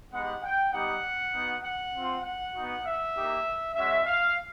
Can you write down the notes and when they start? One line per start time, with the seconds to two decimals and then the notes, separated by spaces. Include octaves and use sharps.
0.12 G#3 B3 D#4 G4 F#5
0.43 G5
0.73 G3 B3 D#4 G4 F#5
1.34 B3 D#4 F#4
1.64 F#5
1.94 C4 F4
2.24 F#5
2.55 B3 D#4 F#4
2.85 E5
3.16 A#3 D#4 G4
3.75 G#3 C#4 F#4 E5
4.06 F5